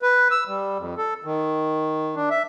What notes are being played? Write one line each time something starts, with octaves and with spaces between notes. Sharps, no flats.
B4
E6
G3
F2
A4
D#3
D4
E5